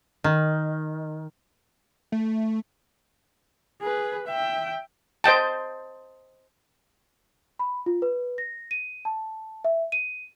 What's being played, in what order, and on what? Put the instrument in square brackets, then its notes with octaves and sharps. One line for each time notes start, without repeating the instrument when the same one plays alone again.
[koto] D#3
[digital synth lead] A3
[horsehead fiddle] G#4 B4
E5 G5
[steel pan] C5 D#5 G5 A5
[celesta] B5
F4
B4
A#6
D#7
A5
E5
D#7